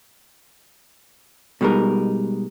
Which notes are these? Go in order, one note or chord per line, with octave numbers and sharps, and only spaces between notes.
B2 G3 G#3 D#4 A#4